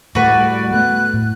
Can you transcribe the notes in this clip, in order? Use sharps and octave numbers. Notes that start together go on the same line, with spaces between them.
A2 G3 A3 F#4 B4 D5
A3 B3 F#6
A2